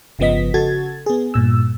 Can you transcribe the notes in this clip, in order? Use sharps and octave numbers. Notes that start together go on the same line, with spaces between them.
G1 C#3 F3 B3 D#5 B6
C#3 F#4 A4 G#6 A6
B3 G#4
G2 A#2 E6